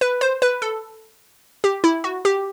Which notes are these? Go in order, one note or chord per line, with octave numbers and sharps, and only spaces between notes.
B4
C5
B4
A4
G4
E4
F#4
G4